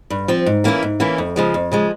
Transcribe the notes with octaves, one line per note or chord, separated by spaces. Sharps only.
G2
F3 C4
G#2
E3 A#3 C#4 E4
G#2
E3 A#3 C#4 E4
F2
C#3 F3 G#3
F2
C#3 F3 G#3